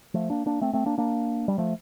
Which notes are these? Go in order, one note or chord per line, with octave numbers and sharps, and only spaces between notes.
F3 A3
A#3 D4
A#3 D4
A3 C4
A3 C4
A#3 D4
A#3 D4
G3
F3 A3